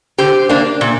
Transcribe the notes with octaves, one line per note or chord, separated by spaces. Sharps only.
D3 G4 C5
A#3 D4
A#2